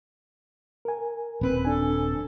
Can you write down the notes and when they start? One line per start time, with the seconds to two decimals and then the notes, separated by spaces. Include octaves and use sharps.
0.85 A#4 G#5
1.41 D#1 C4 B4
1.65 D4 A4 G#5